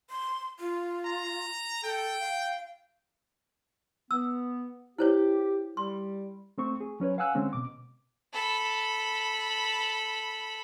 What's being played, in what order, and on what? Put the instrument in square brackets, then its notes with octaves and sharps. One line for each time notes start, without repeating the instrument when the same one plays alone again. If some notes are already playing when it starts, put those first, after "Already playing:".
[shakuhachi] C6
F4
[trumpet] A#5
[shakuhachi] A4 [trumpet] G5
[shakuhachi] F5
[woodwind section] B3 [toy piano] E6
[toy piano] E4 C5 C#5 [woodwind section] G4
[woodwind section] G3 [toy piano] C6
[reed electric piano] A3 C4 C#6
G#4
F#3 C#4 B4 C#5
F5 F#5 G#5 E6 F#6
D3 G#3 C4 C#4
B2 D6
[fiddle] A4 B5